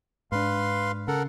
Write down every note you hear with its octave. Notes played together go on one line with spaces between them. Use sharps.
G#2 D4 B4 F5 C6
C#3 A4 A#4 F#5